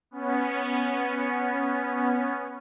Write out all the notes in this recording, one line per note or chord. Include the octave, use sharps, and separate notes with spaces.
B3 C#4